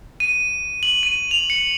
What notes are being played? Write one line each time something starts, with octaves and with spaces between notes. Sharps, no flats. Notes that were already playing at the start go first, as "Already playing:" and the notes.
D#7
F#7
D#7
F7
C#7